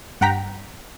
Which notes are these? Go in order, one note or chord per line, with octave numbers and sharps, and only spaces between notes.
G2 F#5 G5 A#5 B6